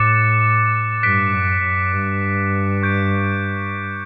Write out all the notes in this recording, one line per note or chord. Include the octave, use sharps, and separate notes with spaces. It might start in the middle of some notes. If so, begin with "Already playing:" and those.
Already playing: A2 D6 F#6 A6 C#7 E7
G2 F#6 B6 D7
F#2
F#2
G2
C#6 G6 D7